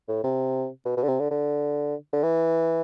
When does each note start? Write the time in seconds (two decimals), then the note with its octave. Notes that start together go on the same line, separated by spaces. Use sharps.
0.08 A2
0.24 C3
0.85 B2
0.97 B2
1.03 D3
1.08 C3
1.20 D3
1.31 D3
2.13 D3
2.23 E3